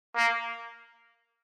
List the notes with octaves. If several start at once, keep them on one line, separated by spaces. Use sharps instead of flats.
A#3